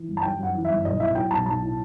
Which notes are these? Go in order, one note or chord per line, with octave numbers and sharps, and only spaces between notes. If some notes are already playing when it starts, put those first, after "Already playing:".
Already playing: E3
G1
A5
G3 G5
F#2 F#5
E3
E5
G1
B1 D#5
A2 E5
F#3 G5
B1 A5
B1 A5
A2